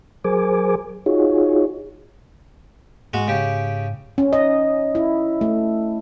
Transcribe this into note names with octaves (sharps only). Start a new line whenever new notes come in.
F#3 G#4 A#4 C5 G#5 D6
D#4 F4 F#4 G#4 C#5
G#2 G#3 F#4
C#3 G4
C#4
D#5
E4
A3